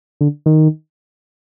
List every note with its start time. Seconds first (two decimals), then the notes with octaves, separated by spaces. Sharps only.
0.21 D3
0.46 D#3